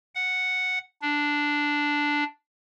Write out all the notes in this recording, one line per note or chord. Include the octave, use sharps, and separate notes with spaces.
F#5
D4